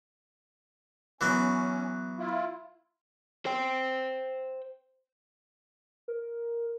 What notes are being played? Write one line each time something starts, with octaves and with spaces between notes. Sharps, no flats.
E3 F#3 B3 C#4
E4 F4
C5 G5
A#4